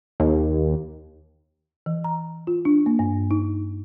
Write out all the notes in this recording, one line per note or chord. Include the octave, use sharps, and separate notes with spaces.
D#2
E3
A#5
F4
D4
A#3
G2
D#4